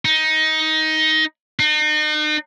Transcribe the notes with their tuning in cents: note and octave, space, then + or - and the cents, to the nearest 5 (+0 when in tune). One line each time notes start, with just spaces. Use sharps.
D#4 +15
D#4 -40